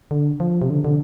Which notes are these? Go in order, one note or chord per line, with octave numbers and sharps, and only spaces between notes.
D3
F3
C3
D3
D3